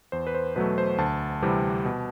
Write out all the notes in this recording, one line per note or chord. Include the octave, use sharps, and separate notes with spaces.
E2 C5
B4
C5
B2 F#3 A3 B4
C5
D2 A5
C3 E3 G3 C4
B2